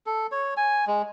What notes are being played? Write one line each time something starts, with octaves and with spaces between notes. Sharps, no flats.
A4
C#5
G#5
G#3